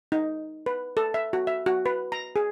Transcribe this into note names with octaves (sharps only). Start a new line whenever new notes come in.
D#4
B4
A4
E5
F#4
E5
F#4
B4
A#5
G#4